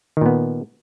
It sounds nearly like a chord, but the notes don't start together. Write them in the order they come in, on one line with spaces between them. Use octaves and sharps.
D#3 A#2 B3